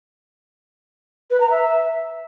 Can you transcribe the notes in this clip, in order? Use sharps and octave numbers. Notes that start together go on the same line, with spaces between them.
B4
A#5
E5